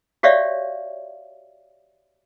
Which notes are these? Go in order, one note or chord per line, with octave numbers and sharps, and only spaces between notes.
F#4 G4 C#5 D5 E5 F5